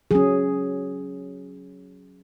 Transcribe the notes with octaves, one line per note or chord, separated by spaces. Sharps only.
F#3 C#4 G#4